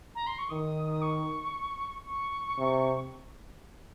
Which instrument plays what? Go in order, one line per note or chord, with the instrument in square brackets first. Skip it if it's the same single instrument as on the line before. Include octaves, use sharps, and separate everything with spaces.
[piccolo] A#5
C6
C#6
[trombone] D#3 [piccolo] D#6
[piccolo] D#6
C#6
C#6
[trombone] C3